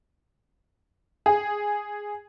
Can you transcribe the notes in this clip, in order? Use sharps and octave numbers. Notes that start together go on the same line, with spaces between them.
G#4